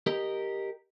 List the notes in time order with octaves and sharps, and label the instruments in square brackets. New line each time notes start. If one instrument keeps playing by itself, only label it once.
[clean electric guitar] G4 A#4 D#5